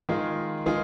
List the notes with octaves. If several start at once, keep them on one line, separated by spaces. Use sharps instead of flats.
D#3 G#3 F4 G#4
D#3 G#3 F4 G#4